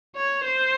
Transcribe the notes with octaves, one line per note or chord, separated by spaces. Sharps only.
C#5
C5